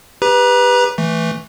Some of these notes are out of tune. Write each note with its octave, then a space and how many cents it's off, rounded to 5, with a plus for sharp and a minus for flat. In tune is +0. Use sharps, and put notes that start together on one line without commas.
G4 +25 B4 +0 A#5 +40
E3 +0 A3 +0